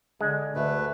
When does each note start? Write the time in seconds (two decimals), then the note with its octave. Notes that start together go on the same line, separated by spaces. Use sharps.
0.21 D3 G#3
0.56 D2 D3 A3 B4